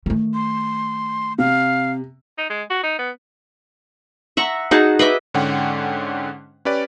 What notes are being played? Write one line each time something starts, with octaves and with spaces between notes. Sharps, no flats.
D#3 A3
C6
C3 F5
D#4
G#3
F#4
D#4
B3
E5 F#5 A#5 C#6
D#4 F#4 G#4 A5
B4 D#5 E5 D6
G#2 D3 C#4 F#5 G5
C#4 G4 B4 D5